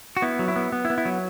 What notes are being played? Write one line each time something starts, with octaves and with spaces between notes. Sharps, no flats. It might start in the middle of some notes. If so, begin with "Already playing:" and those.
F#4
B3 E4
F#3
E4
B3
B3
E4
B3
E4
F#3